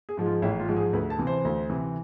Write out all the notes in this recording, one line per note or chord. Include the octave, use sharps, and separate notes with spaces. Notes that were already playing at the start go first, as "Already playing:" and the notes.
G#4
G#2 F3 G#3
F4
A1 E4
F4
G#2 F3 G#3
G#4
D2 B4
A5
C3 E3
C5
D2
C3 E3